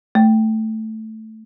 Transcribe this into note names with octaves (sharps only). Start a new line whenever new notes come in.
A3